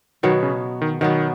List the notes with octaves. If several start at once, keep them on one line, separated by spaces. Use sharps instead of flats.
B2 D#3 F#3 B3
C#3
D#3
B2 D#3 F#3 B3